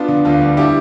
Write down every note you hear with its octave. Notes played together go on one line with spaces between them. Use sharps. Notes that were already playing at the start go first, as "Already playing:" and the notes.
Already playing: B3 D4 F4
D3
D2 D4 F4
G3
D4 E4 G4